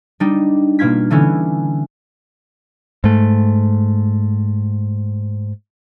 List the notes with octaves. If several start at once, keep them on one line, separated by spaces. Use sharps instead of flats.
G3 D4 D#4
B2 A#3 F4 G#6 B6
D3 E3 B3 C#4 E4
G#2 A3